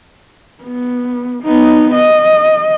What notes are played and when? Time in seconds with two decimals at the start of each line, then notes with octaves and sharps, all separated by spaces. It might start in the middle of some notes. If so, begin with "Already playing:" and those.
0.64 B3
1.44 B3 D#4
1.94 D#5